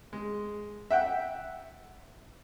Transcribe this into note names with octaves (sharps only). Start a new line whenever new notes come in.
G#3
E5 F#5 G5